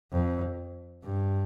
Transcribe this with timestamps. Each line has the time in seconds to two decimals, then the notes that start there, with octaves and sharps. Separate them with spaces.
0.12 F2
1.04 G2